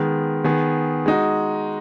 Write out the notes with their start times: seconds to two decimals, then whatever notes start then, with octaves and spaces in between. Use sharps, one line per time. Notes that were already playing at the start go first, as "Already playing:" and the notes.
Already playing: D#3 G#3 B3
0.44 D#3 B3 G#4
1.06 G#3 D#4 F#4